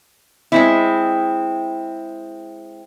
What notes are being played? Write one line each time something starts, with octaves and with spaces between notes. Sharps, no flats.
G#3 C4 E4